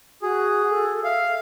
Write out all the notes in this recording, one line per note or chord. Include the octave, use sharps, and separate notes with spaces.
F#4 G#4
A4
E5 F5